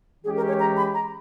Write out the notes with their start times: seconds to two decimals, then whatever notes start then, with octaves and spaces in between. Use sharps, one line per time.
0.24 E3 G#3 C#4 G4 G#4
0.36 A#4
0.48 C#5
0.60 A#5
0.77 B5
0.94 A#5